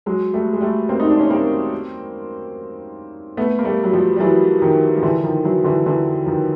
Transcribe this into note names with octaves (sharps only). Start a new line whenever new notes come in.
F#3 G#3
G3 A3
G#3
G3 A3
A#3 C4
D#4
D4
C#4
A#3 C4
A3 B3
A#3
G3 A3
F#3
F3 G3
G3
E3 F#3
D#3 F3
F3
D3 E3
D#3 F3
E3 F#3
D3 E3
D3 E3
D#3 F3